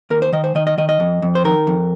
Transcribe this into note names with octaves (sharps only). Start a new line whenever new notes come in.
D#2 A#4
C5
D#3 D#5
C5
D#3 D#5
D#5
D#3 D#5
D#5
F2
F2
C5
D#3 A#4
F2